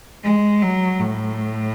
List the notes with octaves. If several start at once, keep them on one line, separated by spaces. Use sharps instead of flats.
G#3
F#3
A2